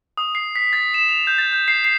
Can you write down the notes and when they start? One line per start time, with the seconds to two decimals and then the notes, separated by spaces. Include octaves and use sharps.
0.17 D#6
0.35 C7
0.56 B6
0.73 A6
0.94 E7
1.09 F7
1.27 G6
1.38 A6
1.53 G6
1.68 C7
1.84 C7